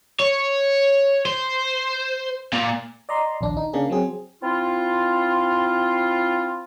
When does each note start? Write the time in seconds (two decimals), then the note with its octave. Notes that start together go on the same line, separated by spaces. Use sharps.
0.19 C#5
1.26 C5
2.53 A#2
3.09 D5 D#5 A#5 C6
3.41 A#1 D#2 D4
3.57 D#4
3.73 C#3 A#3 D4 G#4
3.90 F#3 C4 G#4
4.43 C4 E4 F4